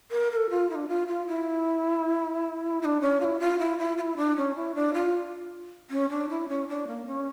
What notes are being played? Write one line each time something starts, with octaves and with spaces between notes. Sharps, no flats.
A#4
A#4
A4
F4
E4
D4
F4
F4
E4
E4
D4
C#4
F4
E4
F4
E4
E4
F4
E4
D4
C#4
E4
D4
F4
C#4
D4
E4
C#4
D4
A#3
C#4